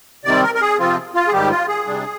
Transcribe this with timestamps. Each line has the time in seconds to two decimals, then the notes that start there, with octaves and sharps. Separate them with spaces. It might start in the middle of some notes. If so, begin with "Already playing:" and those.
0.25 C3 D#3 G3 C4 D5
0.43 A#4
0.55 A#4
0.61 G#4
0.79 C3 F3 C4 F4
1.14 F4
1.27 G#4
1.32 G#2 D#3 G3 G4
1.50 F4
1.68 G#4
1.86 C3 G3 D4